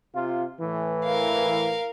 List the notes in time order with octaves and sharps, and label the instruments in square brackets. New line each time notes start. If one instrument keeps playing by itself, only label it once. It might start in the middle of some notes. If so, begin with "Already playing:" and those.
[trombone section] C3 F4
A2 E3
[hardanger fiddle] A#4 F5